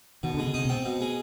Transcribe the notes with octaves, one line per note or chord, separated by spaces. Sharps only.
B2 D#3
D3 G#3
C#3
C3 D#4
B2 C4
B2
G#3